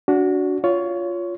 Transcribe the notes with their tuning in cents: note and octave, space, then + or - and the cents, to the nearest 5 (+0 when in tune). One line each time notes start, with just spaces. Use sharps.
D4 -25 F#4 +0
F4 +0 C#5 +20